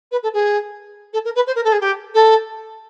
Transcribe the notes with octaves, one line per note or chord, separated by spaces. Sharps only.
B4
A4
G#4
A4
A#4
B4
C5
A#4
A4
G#4
G4
A4